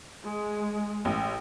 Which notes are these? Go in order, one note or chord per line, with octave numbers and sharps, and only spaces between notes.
G#3
A1